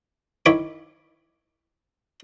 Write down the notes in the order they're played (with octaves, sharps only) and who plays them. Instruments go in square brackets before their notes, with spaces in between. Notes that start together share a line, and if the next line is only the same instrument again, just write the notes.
[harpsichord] D#3 E4 C#5 B5 D6